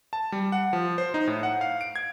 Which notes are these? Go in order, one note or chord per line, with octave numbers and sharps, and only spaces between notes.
A5
G3
F#5
F3
C5
D#4
A2
F#5
F5
D7
G#6